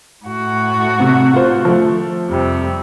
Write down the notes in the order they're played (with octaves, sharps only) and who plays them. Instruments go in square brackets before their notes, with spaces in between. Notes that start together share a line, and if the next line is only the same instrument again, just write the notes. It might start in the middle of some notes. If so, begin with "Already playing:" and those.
[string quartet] A2 F#4
[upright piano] C3
F4 C5
F3 A3
[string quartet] F2 C3 G3